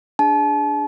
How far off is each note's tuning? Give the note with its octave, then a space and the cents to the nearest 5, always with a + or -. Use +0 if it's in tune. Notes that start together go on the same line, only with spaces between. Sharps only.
D4 +0 G#4 -10 A5 -40